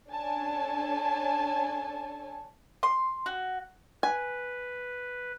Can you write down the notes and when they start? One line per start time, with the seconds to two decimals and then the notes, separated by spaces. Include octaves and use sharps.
0.10 C#4 D4 A4 C#5 G#5 A5
2.83 C6
3.26 F#4
4.03 B4 G#5